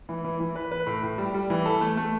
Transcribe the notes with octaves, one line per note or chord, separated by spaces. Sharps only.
E3
E3
E3
B4
B4
A2
A2
G3
G3
E3
A4
A3
A3